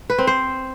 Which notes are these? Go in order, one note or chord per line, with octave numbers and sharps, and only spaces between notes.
B4
C4
C5